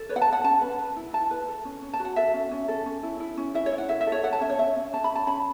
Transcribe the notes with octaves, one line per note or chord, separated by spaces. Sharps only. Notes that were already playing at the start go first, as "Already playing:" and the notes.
Already playing: A4
B4 C#5
F#5
A5
B4
F#5
C#4 A5
B4
B4
E4
E4 A5
B4
A4
C#4
C#4
A5
F#4
F#5
A4 E5
C#4
C#4
A4
C#4
E4
E4
C#4
E4 E5
C#5
E4
F#5
A4 E5
E5
A4
C#5
A4 F#5
A5
C#4 E5
C#5
C#4 E5
C#4
C#4 A5
B5
C#4 A5
C#4 B5